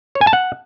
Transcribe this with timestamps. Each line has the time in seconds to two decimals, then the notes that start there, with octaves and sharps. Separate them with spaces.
0.15 C#5
0.21 G#5
0.27 A5
0.33 F#5